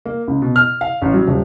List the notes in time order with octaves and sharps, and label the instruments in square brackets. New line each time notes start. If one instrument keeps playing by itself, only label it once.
[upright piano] A#3
C#2
B2
F6
F5
A1
F#3
D#1